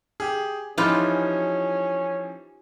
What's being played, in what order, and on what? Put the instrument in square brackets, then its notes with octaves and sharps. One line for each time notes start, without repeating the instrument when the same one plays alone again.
[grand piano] G4 G#4
[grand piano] E3 F3 D#4 [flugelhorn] C#4 [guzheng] F4 G4 B4